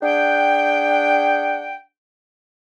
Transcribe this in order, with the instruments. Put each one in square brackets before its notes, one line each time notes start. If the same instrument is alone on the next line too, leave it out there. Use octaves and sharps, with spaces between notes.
[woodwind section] D4 G#4 F#5 G5